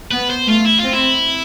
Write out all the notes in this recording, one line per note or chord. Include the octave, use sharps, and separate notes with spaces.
B3 B4
C5
A3 F4
E4
C4 F4
E4